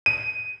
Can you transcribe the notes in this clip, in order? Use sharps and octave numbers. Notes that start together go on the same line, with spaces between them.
D#7